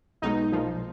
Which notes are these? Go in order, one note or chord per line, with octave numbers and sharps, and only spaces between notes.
B1 B2 G#3 D#4
B1 A#2 F3